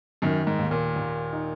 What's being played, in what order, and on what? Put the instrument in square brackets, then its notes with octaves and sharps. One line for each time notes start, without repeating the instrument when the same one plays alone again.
[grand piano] F#2 [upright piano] D#3
[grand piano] G#2
[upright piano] D#2
[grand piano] A#2
[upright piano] D#2
D#4